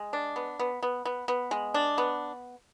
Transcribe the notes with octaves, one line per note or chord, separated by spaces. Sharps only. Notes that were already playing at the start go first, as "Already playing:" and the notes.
Already playing: G#3
D4
B3
B3
B3
B3
B3
G#3
D4
B3